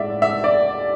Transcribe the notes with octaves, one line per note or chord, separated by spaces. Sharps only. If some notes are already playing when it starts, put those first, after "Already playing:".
Already playing: A2 G#3 D5 E5
E5
D5